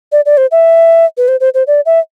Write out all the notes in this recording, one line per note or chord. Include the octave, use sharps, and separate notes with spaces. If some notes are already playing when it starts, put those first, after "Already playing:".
D5
D5
C5
E5
B4
C5
C5
C5
D5
E5